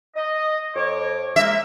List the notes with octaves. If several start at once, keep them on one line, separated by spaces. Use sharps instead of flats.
D#5
F2 C#5 D6
G#3 A#3 E5